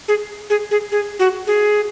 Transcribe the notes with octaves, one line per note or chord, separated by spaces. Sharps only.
G#4
G#4
G#4
G#4
F#4
G#4